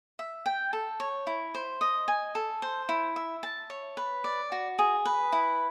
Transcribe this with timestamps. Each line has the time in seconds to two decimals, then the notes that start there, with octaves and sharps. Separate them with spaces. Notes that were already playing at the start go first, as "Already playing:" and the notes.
0.19 E5
0.46 G5
0.73 A4
1.00 C#5
1.27 E4
1.55 C5
1.81 D#5
2.08 G#5
2.35 A4
2.62 C5
2.89 E4
3.16 E5
3.43 A5
3.70 C#5
3.97 B4
4.24 D5
4.52 F#4
4.79 G#4
5.05 B4
5.32 E4